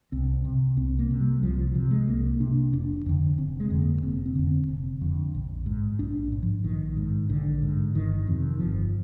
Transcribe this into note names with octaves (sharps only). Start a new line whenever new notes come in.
C2 C4
C3
C2 C4
A#3
C3
G3
C2 F3
F3
C3 F3
G#3
C2 A#3
C3 D4
F1 D4
F2 D3
F1 C4
G#3
F2 D3
A#3
F1 C4
C4
F2 D3
C4
F1
F2 D3
A#1
G#2
A#1 D4
G#2
F3
A#1 D#3
G#2
A#1 D3
G#2
G1 D#3
F2 C3
G1 F3